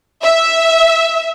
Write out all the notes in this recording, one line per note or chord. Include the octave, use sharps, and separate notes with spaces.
E5